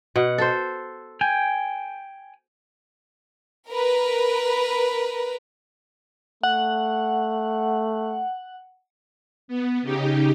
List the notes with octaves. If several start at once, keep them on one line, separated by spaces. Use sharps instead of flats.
B2 F#5
A4 C5
G5 G#5
A#4 B4
A3 F#5
B3
C#3 D#4 G4